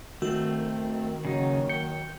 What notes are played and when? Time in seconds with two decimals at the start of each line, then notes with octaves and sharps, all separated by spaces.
0.22 D#3 A3 C4 F#4
1.25 C#3 F#3 A#3 D#4
1.69 G5 C#7